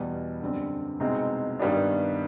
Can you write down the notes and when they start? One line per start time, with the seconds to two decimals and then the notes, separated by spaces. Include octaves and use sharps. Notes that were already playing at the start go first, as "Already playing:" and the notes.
Already playing: E2 B2 G3
0.41 F#2 D3 G3 C4
1.00 C2 B2 G#3 C4 D#4
1.59 G2 D#3 G3 B3 D4